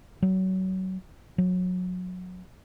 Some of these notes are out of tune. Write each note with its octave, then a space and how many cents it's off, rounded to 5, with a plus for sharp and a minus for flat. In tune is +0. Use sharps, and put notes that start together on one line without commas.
F#3 +25
F#3 -25